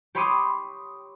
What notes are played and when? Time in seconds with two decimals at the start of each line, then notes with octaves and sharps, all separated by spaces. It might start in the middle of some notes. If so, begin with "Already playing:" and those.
0.15 G4 C#5 B5 C6 D6 D#6